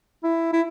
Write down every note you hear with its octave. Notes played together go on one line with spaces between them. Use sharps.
E4
E4